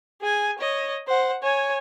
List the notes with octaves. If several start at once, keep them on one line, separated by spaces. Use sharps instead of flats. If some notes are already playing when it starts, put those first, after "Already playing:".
G#4 G#5
C#5 D#5
C5 F#5
C#5 G#5